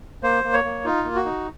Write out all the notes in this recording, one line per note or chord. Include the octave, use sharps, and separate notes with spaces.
A#3 C5
A#3
C#5
A#3
D#4 F4
A#3
F#4
D#4